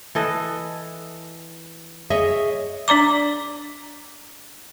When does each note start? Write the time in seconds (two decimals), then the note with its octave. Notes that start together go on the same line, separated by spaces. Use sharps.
0.15 E3 A4 D#5
2.10 G#4 C#5 D#5 E5
2.88 D4 D5 A#5 D6